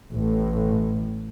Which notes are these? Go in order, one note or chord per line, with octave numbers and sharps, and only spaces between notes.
A1 A2